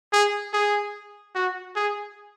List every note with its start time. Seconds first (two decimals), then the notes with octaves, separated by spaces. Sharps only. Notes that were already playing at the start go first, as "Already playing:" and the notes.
0.13 G#4
0.54 G#4
1.35 F#4
1.76 G#4